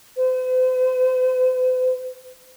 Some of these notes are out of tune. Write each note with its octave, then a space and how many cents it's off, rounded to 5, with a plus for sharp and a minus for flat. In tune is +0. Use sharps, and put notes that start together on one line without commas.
C5 -45